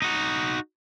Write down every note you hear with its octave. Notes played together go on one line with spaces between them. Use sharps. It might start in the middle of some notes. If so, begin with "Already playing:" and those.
D#4 F#4